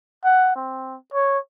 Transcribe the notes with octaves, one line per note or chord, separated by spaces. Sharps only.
F#5
C4
C#5